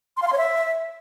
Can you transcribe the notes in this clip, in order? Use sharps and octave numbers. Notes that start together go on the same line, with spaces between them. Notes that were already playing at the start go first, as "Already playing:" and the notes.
C6
F5
C6
C#5
E5